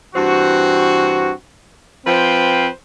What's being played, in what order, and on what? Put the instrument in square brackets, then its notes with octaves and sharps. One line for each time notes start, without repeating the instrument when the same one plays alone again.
[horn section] G2 E3 C4 F#4
F3 C4 B4 C5 F5 G5